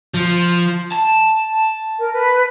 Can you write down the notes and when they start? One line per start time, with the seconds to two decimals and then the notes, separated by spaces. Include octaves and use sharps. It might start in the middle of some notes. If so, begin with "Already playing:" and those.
0.14 F3
0.92 A5
1.99 A#4
2.13 B4